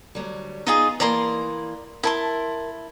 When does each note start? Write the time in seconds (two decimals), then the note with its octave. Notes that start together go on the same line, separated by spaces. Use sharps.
0.15 D2 F#3 G3
0.67 B3 D#4 F4 G#4
1.00 E3 A#3 D5 A#5 C6
2.03 E4 A#4 A5 C6